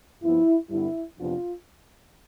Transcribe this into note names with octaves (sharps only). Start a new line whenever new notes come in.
G2 F3 B3 E4
G2 D3 G3 B3 E4
F2 C3 F3 B3 D4 F4